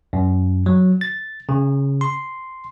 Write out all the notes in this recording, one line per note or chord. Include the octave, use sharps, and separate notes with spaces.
F#2
F#3
A6
C#3
C6